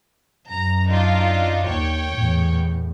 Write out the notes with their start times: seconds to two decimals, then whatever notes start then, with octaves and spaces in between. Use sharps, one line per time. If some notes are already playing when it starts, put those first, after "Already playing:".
0.48 F#2 A#5
0.87 D4 D#4 F4
1.66 D#2 C#5 G5
2.13 E2 A2